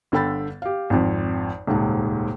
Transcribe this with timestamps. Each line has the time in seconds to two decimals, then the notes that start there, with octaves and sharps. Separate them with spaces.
0.12 G1 D3 A4 G5 B5 A6
0.62 G4 F5
0.90 G#1 F2
1.67 D#1 C#2 G#2 A5